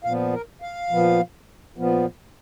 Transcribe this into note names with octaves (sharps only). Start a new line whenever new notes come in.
A#2 F3 B3 F5
A#4
F5
A#2 F3 B3
A#2 F3 B3